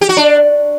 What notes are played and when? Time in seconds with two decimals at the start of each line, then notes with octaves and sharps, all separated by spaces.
0.01 G4
0.09 F#4
0.17 D4